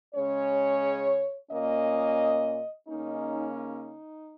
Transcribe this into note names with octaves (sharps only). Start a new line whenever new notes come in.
C#3 G#3 C#4 C#5
A#2 A#3 C#4 D#5
C#3 A#3 C#4 D#4
D#4